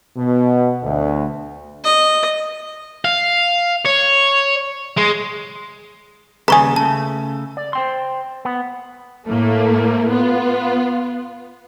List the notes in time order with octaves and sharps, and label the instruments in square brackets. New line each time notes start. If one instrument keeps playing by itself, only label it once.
[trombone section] B2
D2
[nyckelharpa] D#5
[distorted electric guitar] F5
C#5
G#3
[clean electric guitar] D#2 C#3 G3 [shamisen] B4 G#5 [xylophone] A#5 C#6 D#6
[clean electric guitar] C#3 A3 [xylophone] A5
[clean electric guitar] D5
C5 G5 C6
B3
[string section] A2 A3 A#3
B3 F4